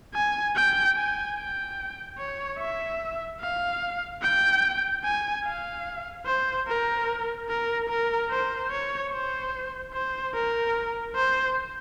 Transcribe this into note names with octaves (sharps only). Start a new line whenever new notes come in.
G#5
G5
G#5
G5
C#5
E5
F5
G5
G#5
F5
C5
A#4
A#4
A#4
C5
C#5
C5
C5
A#4
C5